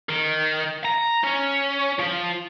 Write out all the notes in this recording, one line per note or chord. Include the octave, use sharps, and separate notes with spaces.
D#3
A#5
C#4
F3